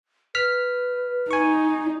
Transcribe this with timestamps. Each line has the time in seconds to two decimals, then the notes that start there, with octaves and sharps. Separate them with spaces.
0.35 B4 F6 B6
1.31 D#4 G#5 C#6